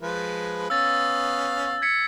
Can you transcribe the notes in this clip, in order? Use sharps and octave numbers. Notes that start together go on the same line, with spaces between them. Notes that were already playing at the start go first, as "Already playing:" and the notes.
F3 G#3 B4
B3 C#4 F5 E6 A6
G#6 B6 C#7